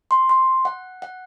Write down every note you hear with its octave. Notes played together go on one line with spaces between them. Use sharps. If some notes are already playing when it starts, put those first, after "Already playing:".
C6
C6
F#5
F#5